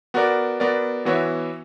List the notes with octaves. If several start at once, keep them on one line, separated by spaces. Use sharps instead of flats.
B3 F#4 A#4 D5
B3 F#4 A#4 D5
E3 B3 F#4 C#5 E5